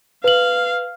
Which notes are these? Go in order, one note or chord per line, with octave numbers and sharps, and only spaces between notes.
B4 F5 F#7